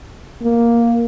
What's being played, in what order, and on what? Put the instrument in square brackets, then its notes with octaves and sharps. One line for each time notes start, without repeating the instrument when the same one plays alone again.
[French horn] A#3